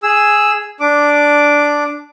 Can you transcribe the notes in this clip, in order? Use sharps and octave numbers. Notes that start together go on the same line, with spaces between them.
G#4 E6
D4 D6